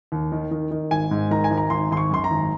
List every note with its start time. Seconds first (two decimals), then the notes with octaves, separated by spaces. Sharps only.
0.12 D#2
0.32 D#3
0.51 D#3
0.71 D#3
0.91 G#1 G#5
1.11 G#2
1.31 D#3 A#5
1.44 G#5
1.51 G#1
1.57 A#5
1.70 G#1 C6
1.91 G#1 C6
1.97 C#6
2.11 F#2 C6
2.24 A#5
2.30 G#1